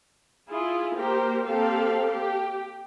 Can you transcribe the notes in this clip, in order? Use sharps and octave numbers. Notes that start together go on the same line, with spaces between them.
E4 F4 G#4
A#3 G4 A#4 C5
A#3 C4 G4 A4 F5
G4